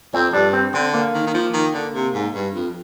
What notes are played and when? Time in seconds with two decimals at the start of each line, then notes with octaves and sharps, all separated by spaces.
0.14 F2 C4
0.33 G2 D4
0.53 C4
0.74 D3 C4
0.94 A#3
1.14 D#3
1.26 D#3
1.34 F3
1.53 D#3
1.74 D3
1.94 C3
2.14 G#2
2.34 G2
2.54 F2